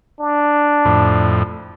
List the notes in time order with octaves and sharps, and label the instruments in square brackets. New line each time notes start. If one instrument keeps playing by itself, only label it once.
[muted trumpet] D4
[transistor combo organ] F2 A2